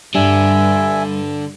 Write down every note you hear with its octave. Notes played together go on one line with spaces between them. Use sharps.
G2 D3 G3 E5 G#5